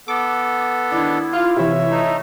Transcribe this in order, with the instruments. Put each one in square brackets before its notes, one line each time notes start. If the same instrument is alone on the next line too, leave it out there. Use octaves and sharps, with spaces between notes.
[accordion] B3 A4 [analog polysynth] D6
[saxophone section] D#3 D4 [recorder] E4
[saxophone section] F4
[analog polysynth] C3 E3 [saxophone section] C#5 E5
[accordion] A3 D#4